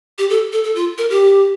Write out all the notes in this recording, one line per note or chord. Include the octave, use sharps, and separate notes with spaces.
G4
A4
A4
A4
F4
A#4
G4